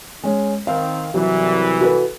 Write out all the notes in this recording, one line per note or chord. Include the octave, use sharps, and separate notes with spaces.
G#3 C#4
D#3 C4 F5
C2 E3 F#3
F#4 A4 B4